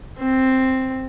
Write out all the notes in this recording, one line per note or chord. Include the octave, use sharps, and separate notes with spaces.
C4